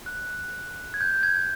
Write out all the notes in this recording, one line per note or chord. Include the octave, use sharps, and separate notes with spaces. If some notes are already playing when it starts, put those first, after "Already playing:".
F#6
G#6
G6
G#6